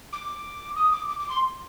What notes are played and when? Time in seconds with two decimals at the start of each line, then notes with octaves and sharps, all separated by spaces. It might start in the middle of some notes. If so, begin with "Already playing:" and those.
0.12 D6
0.76 D#6
0.92 D6
1.08 D6
1.19 D6
1.29 C6